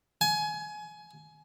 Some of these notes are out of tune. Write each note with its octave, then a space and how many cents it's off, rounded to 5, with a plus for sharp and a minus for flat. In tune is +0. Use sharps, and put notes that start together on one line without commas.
G#5 +25